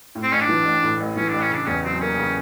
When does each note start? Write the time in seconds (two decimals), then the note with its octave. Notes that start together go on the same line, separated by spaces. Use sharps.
0.15 A2
0.23 C4
0.32 A1 C#4
0.41 D4
0.48 E3
0.65 A1
0.83 A2
1.00 A1
1.16 E3 C#4
1.28 D4
1.34 A1
1.41 C#4
1.50 C#3 D4
1.66 E2 C#4
1.83 F#3 C4
2.01 A#3 C#4
2.18 C#3